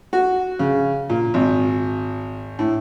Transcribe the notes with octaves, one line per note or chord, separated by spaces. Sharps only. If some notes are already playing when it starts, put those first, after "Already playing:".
F#4
C#3
A#2
G#1
A2